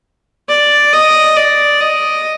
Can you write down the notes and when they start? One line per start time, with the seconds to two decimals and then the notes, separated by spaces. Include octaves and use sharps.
0.48 D5
0.93 D#5
1.36 D5
1.81 D#5